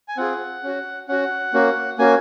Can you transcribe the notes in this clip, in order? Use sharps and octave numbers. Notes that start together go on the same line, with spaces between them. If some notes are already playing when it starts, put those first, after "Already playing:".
G#5
C4 F4 G#4 F#5
C#4 F#4
C#4 F#4 F#5
A#3 C#4 F#4
A#3 C#4 F#4 G#5